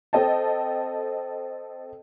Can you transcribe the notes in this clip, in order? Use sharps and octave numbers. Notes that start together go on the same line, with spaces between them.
C4 A4 D#5 G5 A5